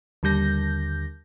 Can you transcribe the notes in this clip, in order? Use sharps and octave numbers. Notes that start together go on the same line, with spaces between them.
D#2 D3 G3 G6 A#6